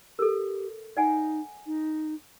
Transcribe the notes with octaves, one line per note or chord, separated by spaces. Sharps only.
G4 A4 A#4
D#4 D5 F#5 G#5
D#4